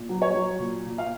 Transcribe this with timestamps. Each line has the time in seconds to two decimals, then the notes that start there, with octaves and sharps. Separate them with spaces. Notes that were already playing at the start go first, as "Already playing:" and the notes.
Already playing: A#2
0.09 F#3
0.22 C#5
0.34 F#3
0.59 A#2
0.86 A#2
0.98 F5